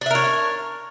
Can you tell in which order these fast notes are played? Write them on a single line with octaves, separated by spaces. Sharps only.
D4 E5 A#4 C#5